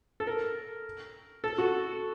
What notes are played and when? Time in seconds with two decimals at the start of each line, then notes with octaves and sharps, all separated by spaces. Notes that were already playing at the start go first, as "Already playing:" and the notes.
0.20 A4
0.27 A#4
1.44 A4
1.58 F#4